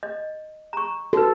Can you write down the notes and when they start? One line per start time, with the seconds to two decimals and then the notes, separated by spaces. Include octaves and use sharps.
0.03 D#5
0.73 A#5 C#6
1.13 F#4 A4 B4